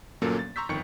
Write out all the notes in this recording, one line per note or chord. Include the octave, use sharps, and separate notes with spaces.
G1 A#2 F#3 A#3 C#4 A4
A6
A#5 C6 C#6 E6 G6 B6
G1 F2 D#3 G5 C#6 C#7